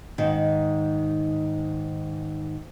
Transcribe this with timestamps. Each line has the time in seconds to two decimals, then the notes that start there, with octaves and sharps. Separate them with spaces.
0.18 G#2 D#3